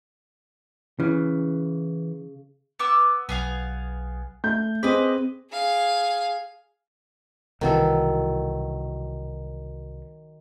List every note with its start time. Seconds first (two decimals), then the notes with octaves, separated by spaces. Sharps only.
1.00 C#3 E3
2.79 B3 D6 E6
3.29 B1 B3 G#4 F5
4.44 A3 G6
4.83 C4 G#4 B4 D#5 D6
5.51 G#4 F5
7.61 C2 B2 D#3 E3 F#3 A4